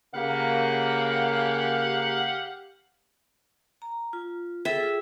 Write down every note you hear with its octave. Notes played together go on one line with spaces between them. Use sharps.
C#3 A#3 G4 F5 F#5
A#5
F4
G#4 A4 E5 G5
F4 G#4